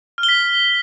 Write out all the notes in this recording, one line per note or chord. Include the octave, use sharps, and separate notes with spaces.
F6
G7
B6